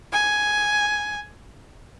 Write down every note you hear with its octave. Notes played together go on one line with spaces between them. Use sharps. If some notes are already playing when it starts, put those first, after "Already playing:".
G#5